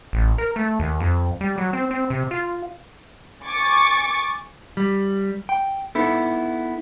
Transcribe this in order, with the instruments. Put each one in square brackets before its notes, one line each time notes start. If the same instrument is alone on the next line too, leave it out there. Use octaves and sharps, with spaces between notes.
[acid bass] A1
A#4
A3
D#2
F2
G3
F#3
C4
C4
C3
F4
[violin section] G#5 C#6 D6 A6
[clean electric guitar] G3
G5
B3 D#4 E4 A4